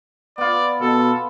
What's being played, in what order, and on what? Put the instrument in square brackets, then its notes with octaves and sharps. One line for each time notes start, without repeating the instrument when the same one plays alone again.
[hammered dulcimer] B3 F4 [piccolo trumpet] D5 [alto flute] B5
[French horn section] B2 [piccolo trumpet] A4